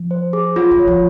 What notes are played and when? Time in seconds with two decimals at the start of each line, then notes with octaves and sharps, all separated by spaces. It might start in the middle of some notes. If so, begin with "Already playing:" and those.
Already playing: F3
0.11 C5
0.33 G#4
0.56 F#3 F4
0.71 F#3
0.79 C#5
0.87 F3